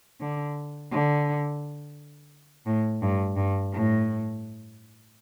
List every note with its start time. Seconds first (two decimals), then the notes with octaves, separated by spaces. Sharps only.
0.20 D3
0.91 D3
2.66 A2
3.02 G2
3.36 G2
3.73 A2